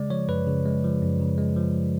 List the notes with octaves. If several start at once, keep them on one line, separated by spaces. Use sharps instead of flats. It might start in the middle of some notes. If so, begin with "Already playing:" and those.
Already playing: C#3 G#3 D5
F3 C#5
F#2 B4
C#3
G#3
F3
F#2
C#3
G#3
F3